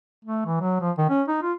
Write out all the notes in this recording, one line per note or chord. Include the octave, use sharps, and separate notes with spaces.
A3
E3
F#3
F3
D#3
C#4
D#4
F4